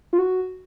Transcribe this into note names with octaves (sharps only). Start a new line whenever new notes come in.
F4
F#4